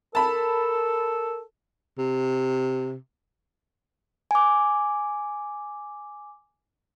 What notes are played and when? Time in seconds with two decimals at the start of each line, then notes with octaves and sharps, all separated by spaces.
0.15 A4 A#4 A5 B5
1.99 C3
4.31 G#5 D6